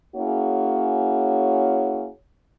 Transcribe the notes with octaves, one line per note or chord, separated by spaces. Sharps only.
A#3 C#4 E4 F#4 G#4 C#5